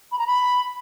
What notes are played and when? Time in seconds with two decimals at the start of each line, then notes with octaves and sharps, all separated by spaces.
0.12 B5
0.19 A#5
0.27 B5